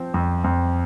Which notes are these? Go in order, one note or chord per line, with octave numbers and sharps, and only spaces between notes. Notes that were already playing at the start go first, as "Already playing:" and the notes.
Already playing: F3 C4
F2
F2